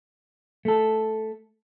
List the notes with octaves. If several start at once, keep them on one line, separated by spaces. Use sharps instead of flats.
A3 A4